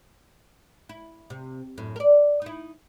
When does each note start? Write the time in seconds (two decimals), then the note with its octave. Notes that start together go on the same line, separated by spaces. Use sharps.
0.89 E4
1.30 C3
1.78 F#2 A2
1.96 A#4 D5
2.42 D#4 E4